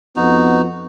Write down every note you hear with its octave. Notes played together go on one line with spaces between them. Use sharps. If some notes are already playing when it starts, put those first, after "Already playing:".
F2 B3 D#4 F#4